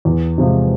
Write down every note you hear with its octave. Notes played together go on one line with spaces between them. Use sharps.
E2
C3 F3 G#3